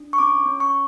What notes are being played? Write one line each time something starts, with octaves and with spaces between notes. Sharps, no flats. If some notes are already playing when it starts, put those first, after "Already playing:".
Already playing: D4
C#6
C#4 D6
C#4
C#6